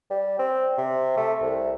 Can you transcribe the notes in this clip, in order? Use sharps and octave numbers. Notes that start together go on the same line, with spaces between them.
G3
C4
C3
A3
C2